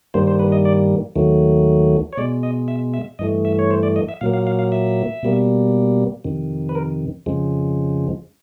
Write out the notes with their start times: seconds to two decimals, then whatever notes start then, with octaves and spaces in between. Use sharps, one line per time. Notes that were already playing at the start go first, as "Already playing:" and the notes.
0.14 G2 D#3 G3 A#3 C5
0.27 C5
0.39 B4
0.52 D#5
0.65 D5
1.16 D#2 D#3 F#3 A3
2.13 C#5
2.17 B2 G#3 D5
2.43 D#5
2.68 E5
2.94 E5
3.19 G2 E3 A3 D#5
3.45 E5
3.59 C#5
3.71 C5
3.83 D5
3.96 D#5
4.09 E5
4.21 A#2 F#3 A#3 F5
4.33 F5
4.47 F5
4.59 F5
4.72 E5
5.23 B2 G3 A#3
6.24 F2 C3 D#3
6.69 B4
6.75 A#4
7.26 F2 C#3 F3 G#3